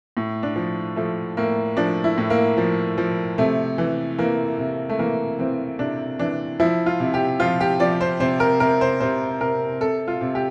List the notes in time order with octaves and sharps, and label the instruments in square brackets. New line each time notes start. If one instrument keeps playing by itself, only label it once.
[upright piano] A2
D4
F3
F3 A3
A2 A#3
F3 D4
E4
A2
A#3
F3
F3
C3 A3
E3
E3 A#3
C3
A3
E3 A#3
E3 C4
C3 D4
E3 D4
F3 E4
F4
C3
G4
F3 F4
G4
F3 D5
C5
C3 C5
A#4
C3 A#4
C5
C3 C5
C3 A#4
C3 A4
F4
C3
G4